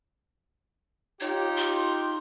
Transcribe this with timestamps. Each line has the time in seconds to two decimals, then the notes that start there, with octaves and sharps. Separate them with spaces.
1.21 D#4 F4 G4 C#5
1.57 C6